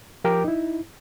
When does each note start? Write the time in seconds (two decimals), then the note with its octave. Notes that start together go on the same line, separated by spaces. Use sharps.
0.24 F3 G4 A#4 G5 D6
0.44 D#4 E4